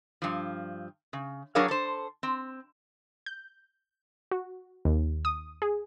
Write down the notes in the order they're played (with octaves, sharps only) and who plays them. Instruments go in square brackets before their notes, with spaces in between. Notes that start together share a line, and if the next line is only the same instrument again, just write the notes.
[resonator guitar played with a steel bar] G2 F3
C#3
F#3 D4 G#4 A#4 C#5 F5
A4 C5
C4
[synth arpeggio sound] G6
F#4
D#2
D#6
G#4